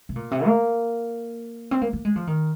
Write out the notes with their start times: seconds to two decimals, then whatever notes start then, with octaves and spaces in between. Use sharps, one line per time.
0.09 C3
0.16 A#2
0.31 C3
0.46 A#3
1.71 C4
1.81 A#3
1.93 A#3
2.05 G#3
2.16 F3
2.27 D#3